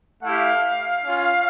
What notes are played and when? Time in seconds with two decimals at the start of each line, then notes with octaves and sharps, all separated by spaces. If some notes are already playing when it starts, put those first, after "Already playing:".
0.23 A3 E4 G4 F5
1.04 C#4 F4